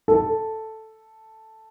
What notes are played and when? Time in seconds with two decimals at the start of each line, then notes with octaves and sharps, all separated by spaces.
0.08 A4